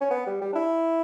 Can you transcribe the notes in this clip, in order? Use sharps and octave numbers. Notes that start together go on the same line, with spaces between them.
C#4
B3
G3
G3
D4
E4